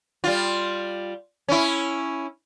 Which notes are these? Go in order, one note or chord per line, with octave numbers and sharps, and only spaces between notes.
G3 F4
C#4 E4